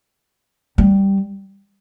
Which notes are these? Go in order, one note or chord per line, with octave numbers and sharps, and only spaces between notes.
G3